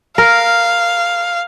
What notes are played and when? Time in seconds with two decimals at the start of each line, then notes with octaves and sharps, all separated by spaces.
0.18 A#4 F5